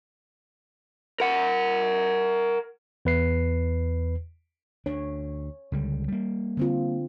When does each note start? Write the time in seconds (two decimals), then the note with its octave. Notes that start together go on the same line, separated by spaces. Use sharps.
1.20 A#4 F#5
3.05 E2 B4 C7
4.86 D2 D4 C#5
5.72 C#2 D3 G3
6.08 G3 A#3
6.57 D3 C4 F4